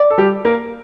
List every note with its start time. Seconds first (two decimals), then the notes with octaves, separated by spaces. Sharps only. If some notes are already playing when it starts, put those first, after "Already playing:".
Already playing: D5
0.10 A4
0.18 G3 G4
0.45 A#3 A#4